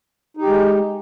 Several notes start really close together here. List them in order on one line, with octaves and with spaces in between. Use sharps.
D#4 G4 G#3